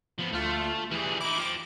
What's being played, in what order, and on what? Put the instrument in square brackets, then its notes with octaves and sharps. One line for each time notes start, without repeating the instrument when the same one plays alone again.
[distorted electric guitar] F3 B3
[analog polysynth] D2 F4 [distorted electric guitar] A3
[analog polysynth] E3 [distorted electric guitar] G3 G#4
[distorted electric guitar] D#4 E4 [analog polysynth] D6
[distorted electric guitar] F4 G5